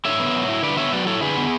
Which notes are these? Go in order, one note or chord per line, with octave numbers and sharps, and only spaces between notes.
D3 C#5 E5
B3
F#3
E4
D3 B4 D5
B3 C#5 E5
F#3 B4 D5
E4 A4 C#5
D3 G#4 B4
B3